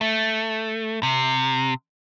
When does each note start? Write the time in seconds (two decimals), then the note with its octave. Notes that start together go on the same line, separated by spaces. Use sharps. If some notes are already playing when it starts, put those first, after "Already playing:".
0.01 A3
1.03 C3